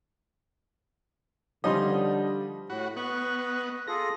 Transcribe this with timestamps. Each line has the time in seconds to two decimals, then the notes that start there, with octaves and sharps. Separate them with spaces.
1.64 D3 F3 G3 C#4 D#4 D#5 C6
2.70 A2 F#4 B5
2.96 B3 D#5 C#6 F#6
3.87 F4 G#4 A4 A#6